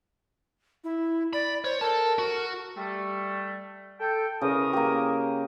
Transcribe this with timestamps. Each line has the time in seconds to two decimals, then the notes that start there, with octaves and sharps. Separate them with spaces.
0.84 E4
1.33 D5 B5
1.64 C5 C#5
1.81 A4 A#4 A5
2.19 F#4
2.77 G3 A3
4.00 A4 G5
4.41 E2 C#3 A#4 D#6
4.73 A#3 G4